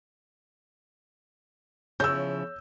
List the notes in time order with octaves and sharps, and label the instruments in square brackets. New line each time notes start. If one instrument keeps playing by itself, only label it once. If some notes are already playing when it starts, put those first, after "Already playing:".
[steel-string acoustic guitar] C#3 F3 E4 [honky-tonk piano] C#5 [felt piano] E6 G6